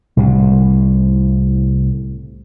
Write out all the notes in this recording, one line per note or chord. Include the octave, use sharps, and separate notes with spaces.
C2 A2 C3